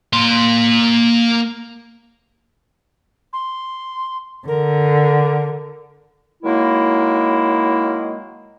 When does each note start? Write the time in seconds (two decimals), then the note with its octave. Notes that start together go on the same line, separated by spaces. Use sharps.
0.13 A#3 C6
3.33 C6
4.48 D3 A#4
6.43 D#3 F#3 G#3 A#3 E4